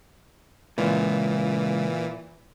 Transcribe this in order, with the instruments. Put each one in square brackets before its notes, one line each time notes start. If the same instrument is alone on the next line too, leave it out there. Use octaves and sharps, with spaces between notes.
[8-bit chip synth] A#2 E3 [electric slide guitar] C#3 G#3